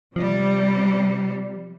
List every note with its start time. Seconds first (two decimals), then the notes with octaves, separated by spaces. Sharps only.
0.16 C3 F3 G3